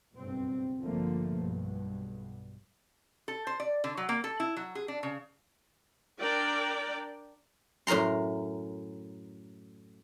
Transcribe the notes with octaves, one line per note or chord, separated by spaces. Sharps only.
F#1 B1 G2 C4
A#1 G2 D3 F3 A3 A#3
B1 G2 B2
A4
C5
D5
D3
F#3
A#3
A4
E4
F#3
G#4
D4
C#3
D4 A#4 D5 G5
F#2 A2 A#4 A#5 C6